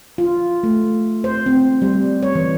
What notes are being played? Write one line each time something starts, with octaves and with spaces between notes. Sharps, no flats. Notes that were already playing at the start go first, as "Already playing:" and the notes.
F4
A3
C5
C4
G3
C#5
E3